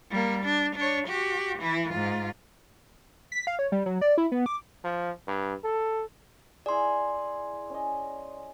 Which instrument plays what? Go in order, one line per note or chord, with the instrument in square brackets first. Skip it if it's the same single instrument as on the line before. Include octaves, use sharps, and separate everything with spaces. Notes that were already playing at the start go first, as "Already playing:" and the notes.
[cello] G3 A#3
D4
D4 C#5
F#4 G4
E3 E4
G#2 F4
[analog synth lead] B6
F5
C#5
G3
F#3
D5
E4
B3
D6
[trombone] F3
G2
A4
[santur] E4 G#4 [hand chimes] D5 C6
[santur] C#4 D#5